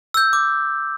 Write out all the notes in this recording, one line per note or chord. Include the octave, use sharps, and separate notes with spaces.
E6 G6
D6